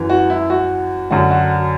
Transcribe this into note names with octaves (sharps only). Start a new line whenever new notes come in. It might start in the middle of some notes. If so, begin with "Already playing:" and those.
Already playing: F#2 E3
F#4
E4
F#4
F#2 D3 F#3 F#4
F#4